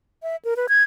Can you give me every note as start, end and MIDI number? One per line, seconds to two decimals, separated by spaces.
0.23 0.36 76
0.45 0.54 70
0.57 0.67 71
0.69 0.83 92